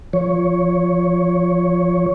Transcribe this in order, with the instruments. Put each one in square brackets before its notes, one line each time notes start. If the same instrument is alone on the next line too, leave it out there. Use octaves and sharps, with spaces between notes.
[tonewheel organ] F3 C#5